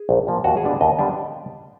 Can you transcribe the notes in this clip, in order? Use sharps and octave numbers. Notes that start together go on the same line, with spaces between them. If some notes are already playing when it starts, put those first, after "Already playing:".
Already playing: G#4
A#1
A#2 F3 A#3
D#2 F#4
G#4
D3 G3 B3 D4
D#2 D#5
D3 G3 B3 D4